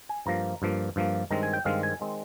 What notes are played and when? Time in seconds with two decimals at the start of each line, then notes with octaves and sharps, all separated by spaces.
0.09 G#5
0.26 G2 F3 A#3 A#5
0.62 G2 F3 A#3
0.96 G2 F3 A#3
1.31 G2 D#3 G#3 C4 A#5
1.43 G#5
1.53 G5
1.65 G2 D#3 G#3 C4 F5
1.83 G#5
2.00 D#3 G#3 C4